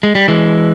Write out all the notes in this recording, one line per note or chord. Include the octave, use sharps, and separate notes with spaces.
G#3
G3
E3 G#3